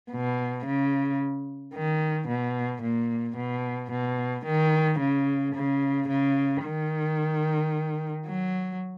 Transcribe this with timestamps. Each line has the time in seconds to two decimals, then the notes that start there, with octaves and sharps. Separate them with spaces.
0.11 B2
0.66 C#3
1.74 D#3
2.28 B2
2.82 A#2
3.36 B2
3.91 B2
4.45 D#3
4.99 C#3
5.55 C#3
6.08 C#3
6.63 D#3
8.26 F#3